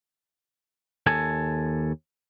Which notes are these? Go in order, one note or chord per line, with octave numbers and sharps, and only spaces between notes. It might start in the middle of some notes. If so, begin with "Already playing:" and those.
D#2 A4 G#5